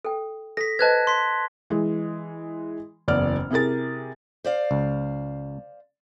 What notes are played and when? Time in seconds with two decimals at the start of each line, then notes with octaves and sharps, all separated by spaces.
0.05 A4 G5
0.57 A4 A#6 B6
0.79 B4 C5 D#5 A5 F#6 G#6
1.07 C6 B6
1.70 E3 G#3
3.08 F#1 E2 D5 F6
3.50 C3 E4 G#4 A#4 A6
4.44 C5 D5 F5
4.71 C#2